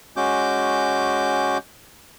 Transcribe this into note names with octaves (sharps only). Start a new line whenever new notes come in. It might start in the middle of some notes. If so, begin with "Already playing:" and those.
G#3 C#4 F#4 D6 G6